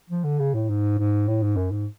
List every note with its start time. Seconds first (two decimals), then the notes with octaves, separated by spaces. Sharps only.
0.10 F3
0.24 D3
0.39 C#3
0.54 A2
0.69 G#2
0.98 G#2
1.28 A2
1.42 G#2
1.56 F#2
1.71 G#2